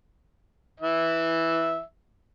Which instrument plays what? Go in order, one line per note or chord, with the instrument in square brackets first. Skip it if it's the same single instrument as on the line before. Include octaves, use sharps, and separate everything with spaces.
[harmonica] E3 E5